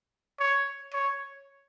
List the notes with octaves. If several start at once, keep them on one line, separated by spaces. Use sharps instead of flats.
C#5
C#5